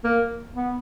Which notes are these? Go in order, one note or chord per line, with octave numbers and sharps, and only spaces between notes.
A#3
B3